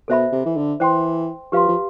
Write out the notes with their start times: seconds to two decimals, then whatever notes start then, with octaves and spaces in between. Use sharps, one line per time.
0.08 B2 A4 C5 E5 B5
0.32 C3
0.45 E3
0.56 D3
0.80 E3 C5 G5 C6
1.52 F3 G4 B4 F5 C6
1.68 F3